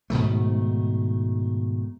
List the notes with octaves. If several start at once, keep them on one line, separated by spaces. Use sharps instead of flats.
G#2 B2 D#3 A3